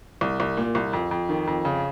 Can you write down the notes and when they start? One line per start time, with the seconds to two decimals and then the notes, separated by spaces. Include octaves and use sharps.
0.21 C2
0.40 C2
0.57 A#2
0.75 C2
0.93 F2
1.11 F2
1.29 D#3
1.47 F2
1.65 C#3